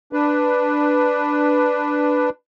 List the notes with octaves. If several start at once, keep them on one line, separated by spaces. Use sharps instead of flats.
D4 B4